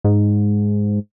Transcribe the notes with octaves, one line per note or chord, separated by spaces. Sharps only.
G#2